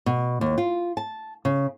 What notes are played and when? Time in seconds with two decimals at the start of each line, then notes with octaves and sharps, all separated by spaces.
0.06 B2
0.41 D#2
0.58 F4
0.97 A5
1.45 C#3